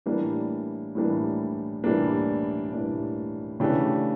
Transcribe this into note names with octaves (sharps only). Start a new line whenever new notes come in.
A2 E3 G3 A#3 D4
A2 E3 G3 A#3 D4
A2 E3 G3 A#3 D4
A2 E3 G3 A#3 D4
C#3 E3 A3 D4 G4